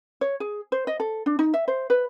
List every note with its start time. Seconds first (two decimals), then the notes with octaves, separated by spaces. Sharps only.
0.21 C#5
0.40 G#4
0.72 C5
0.87 D#5
1.00 A4
1.26 D4
1.39 D#4
1.54 E5
1.68 C5
1.90 B4